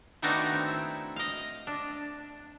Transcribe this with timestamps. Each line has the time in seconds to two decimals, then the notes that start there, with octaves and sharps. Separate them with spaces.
0.22 D#3 A3 B3 D4 D#4 F#4
0.54 C4
0.69 E4
1.16 D#5 F5
1.67 D4